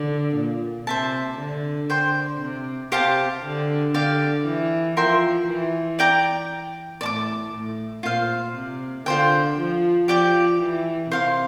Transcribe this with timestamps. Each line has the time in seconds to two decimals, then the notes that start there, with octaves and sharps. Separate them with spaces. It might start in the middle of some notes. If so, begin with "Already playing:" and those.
Already playing: D3
0.36 A#2
0.87 C3 C5 E5 A5
1.38 D3
1.89 D3 C5 G5 C6
2.40 C3
2.92 C3 G4 C5 F5 A5
3.43 D3
3.94 D3 G4 D5 F5
4.45 E3
4.97 F3 A#4 E5 G5 C6
5.48 E3
5.99 D5 G5 A#5 D6
7.01 A2 D5 A5 D6
7.52 A2
8.03 A#2 F4 C5 F5
8.55 C3
9.06 D3 F4 C5 G5
9.58 F3
10.08 F3 G4 D5 G5 D6
10.60 E3
11.11 C3 C5 F5 C6